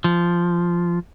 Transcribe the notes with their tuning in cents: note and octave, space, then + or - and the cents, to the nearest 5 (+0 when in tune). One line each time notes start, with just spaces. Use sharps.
F3 -10